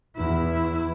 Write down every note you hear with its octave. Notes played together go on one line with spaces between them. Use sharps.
E2 E4